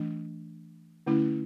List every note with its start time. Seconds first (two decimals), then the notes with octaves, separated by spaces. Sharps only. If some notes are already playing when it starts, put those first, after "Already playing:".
Already playing: E3 A3 D4
1.07 D3 A3 C#4 E4